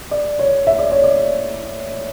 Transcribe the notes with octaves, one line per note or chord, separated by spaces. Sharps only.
D5
C#5
E5
D5
C#5
D5